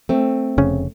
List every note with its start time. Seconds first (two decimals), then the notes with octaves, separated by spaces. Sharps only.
0.09 A3 C4
0.58 F1 C#3 C#4